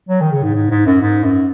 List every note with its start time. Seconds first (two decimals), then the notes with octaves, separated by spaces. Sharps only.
0.09 F#3
0.21 D#3
0.32 C#3
0.43 G#2
0.55 G#2
0.71 G#2
0.86 F#2
1.01 G#2
1.24 F#2